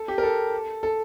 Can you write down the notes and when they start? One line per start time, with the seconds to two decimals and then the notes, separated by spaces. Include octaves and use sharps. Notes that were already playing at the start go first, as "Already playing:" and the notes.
Already playing: A4
0.08 G4
0.18 A#4
0.23 A4
0.83 A4